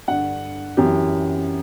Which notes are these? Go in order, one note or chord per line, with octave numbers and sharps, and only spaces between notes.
G2 D3 F#5
F#2 E3 G4